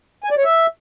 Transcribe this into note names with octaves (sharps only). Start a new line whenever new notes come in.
G#5
D5
C#5
E5